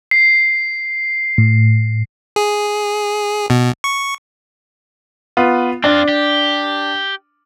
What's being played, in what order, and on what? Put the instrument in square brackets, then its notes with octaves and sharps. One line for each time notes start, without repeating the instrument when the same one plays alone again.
[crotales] C7
[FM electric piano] A2
[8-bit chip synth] G#4
B2
C#6
[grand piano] B3 F4
[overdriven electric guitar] C4 F4 [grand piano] D4
[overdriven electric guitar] G4